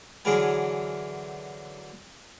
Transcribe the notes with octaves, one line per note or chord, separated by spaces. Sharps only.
D3 E3 F#3 G#4 A#4 G#5